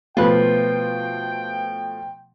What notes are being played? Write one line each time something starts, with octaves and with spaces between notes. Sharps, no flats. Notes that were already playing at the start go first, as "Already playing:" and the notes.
B2 F3 A3 F4 B4 G5